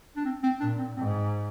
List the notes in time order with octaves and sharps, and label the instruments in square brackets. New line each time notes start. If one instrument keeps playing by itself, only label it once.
[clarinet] D4
C4
C4
[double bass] A#2 [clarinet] D4
[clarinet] C4
[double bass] G#2 [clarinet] C4